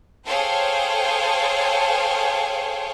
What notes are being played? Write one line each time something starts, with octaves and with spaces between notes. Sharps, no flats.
G#4 A4 C5 C#5 F5 G5